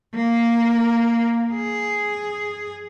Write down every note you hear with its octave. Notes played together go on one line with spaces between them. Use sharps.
A#3
G#4